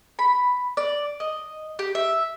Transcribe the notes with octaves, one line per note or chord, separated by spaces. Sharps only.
B5
D5
D#5
G4
E5